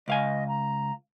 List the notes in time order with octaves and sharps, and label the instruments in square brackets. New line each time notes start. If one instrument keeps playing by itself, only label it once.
[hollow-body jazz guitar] C#2 F5 G#5 [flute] D#5
[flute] A#5